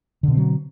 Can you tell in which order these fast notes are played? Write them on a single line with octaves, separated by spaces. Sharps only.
D3 B2 C4 F#3